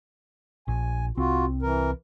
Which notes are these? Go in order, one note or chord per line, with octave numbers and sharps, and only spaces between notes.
A#1 G#5
C2 C4 F4 F#4
E3 A#4